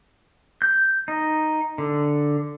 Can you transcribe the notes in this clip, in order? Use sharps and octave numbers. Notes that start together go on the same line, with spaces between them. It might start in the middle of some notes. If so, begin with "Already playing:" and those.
G6
D#4
D3